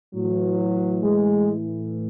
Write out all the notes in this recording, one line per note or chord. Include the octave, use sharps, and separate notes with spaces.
A2 E3 F#3
G#3